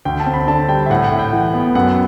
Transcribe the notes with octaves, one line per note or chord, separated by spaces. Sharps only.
D2 G5
A5
C4
B5
D3 A5
G3 G5
E5
A2 F#5
F#5
A2
G5
E3
B3
F#2 F#5